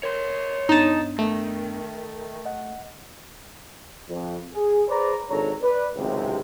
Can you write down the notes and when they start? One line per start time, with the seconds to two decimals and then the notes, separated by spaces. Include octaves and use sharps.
0.03 A#4 C#5 C6
0.69 G2 B3 D4 D#4 A5
1.19 D#3 A3
2.45 D#5 F#5
4.09 F2
4.53 G#4
4.88 G#4 B4 C5 D5 A#5
5.30 G#1 D4 A4 C#5 A#5
5.62 B4 D5
5.96 G#1 C#2 F#2 A2 C3